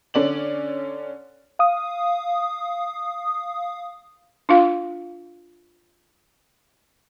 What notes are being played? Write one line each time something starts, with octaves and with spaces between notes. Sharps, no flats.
D3 C#4 D5 F#7
F5 D#6
D4 F4 F5